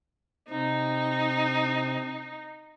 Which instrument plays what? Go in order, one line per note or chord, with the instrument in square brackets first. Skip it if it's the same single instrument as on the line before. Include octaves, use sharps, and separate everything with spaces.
[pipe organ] C3 C4 [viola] D#4